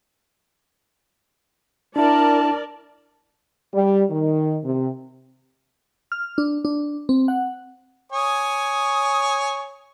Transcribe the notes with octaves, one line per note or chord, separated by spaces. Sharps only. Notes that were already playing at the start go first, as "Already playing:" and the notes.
D4 E4 A#4 D5 A5
G3
D#3
C3
F6
D4
D4
C4
F#5
C#5 G#5 D#6